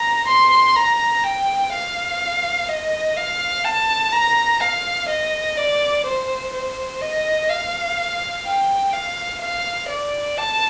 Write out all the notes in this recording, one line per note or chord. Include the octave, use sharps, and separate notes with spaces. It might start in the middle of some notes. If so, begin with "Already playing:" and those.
Already playing: A#5
C6
A#5
G5
F5
D#5
F5
A5
A#5
F5
D#5
D5
C5
C5
D#5
F5
G5
F5
F5
D5
A5